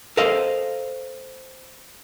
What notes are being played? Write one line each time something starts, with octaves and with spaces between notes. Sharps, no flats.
A4 A#4 C5 D#5 F5